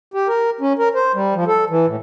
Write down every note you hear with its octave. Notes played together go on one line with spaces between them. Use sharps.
G4
A#4
C#4
A#4
C5
G3
F3
A4
E3
A2